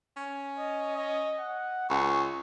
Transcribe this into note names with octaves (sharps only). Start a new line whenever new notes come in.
C#4
D#5
D#5
F#5
C#2 C#6